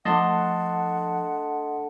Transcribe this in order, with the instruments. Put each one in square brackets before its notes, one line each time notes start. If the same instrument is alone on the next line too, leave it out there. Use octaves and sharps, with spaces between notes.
[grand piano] F3 [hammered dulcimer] A3 D4 [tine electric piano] D#5 A5 C6 [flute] F#5